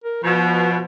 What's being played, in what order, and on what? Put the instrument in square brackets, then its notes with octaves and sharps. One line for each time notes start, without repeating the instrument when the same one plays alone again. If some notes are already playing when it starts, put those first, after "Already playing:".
[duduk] A#4
[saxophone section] B2 [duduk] F3